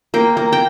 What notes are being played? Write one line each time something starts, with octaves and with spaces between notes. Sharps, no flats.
A#3 G5
A#3
G5